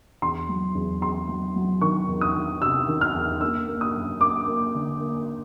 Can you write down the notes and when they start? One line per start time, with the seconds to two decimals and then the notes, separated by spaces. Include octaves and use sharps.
0.22 E2 C6
0.49 F#3
0.75 E2
1.01 E2 C6
1.29 F#3
1.56 F#3
1.81 D#3 C#6
2.08 E2
2.21 D#6
2.36 D#3
2.62 C3 E6
2.88 D#3
3.01 F6
3.14 E2
3.41 A#3 E6
3.68 A#3
3.81 D#6
3.95 F#2
4.21 A#3 D6
4.47 A#3
4.75 D3
5.00 A#3